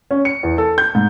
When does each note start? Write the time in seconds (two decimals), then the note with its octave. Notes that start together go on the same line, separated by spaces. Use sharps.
0.11 C#4
0.25 C#7
0.43 E2
0.58 A4
0.78 G6
0.95 G#2